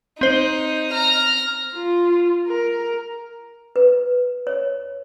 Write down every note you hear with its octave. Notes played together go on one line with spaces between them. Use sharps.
C4 D#4 C5
A#5 F6
F4
A#4
B4
C#5